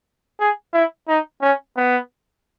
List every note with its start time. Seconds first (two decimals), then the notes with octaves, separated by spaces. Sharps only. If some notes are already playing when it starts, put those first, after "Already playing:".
0.40 G#4
0.73 E4
1.08 D#4
1.42 C#4
1.77 B3